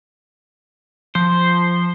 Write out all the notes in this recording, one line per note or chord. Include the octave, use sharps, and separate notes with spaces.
F3 C5